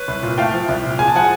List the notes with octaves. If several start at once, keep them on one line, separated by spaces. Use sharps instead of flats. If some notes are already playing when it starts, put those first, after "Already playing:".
Already playing: B4 C#5
C2
A#2
A3 F5 G5
F3
C2
A#2
G#3 G#5
A5
F3 F#5 G#5